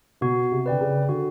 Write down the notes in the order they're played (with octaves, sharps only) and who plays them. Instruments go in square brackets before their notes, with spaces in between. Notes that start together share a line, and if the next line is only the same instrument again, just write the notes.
[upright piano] B2 [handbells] F#4
[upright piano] C3
[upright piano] D3 [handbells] B4 D5 G5
[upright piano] C#3
[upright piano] D3 [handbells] F#4